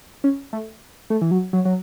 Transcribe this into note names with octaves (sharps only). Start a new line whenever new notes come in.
C#4
A3
A3
E3
F#3
F#3
F#3